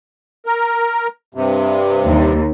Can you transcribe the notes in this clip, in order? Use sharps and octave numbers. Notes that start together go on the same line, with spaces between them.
A#4
G2 C3
D#2